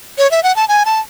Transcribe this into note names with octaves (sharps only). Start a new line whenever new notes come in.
C#5
E5
F#5
A5
G#5
A5